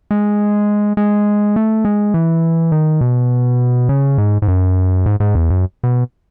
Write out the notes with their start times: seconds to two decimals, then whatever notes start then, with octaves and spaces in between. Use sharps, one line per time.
0.11 G#3
0.97 G#3
1.56 A3
1.85 G#3
2.14 E3
2.72 D#3
3.01 B2
3.89 C#3
4.18 G#2
4.42 G#2
4.48 F#2
5.06 G#2
5.20 G#2
5.35 E2
5.50 F#2
5.83 B2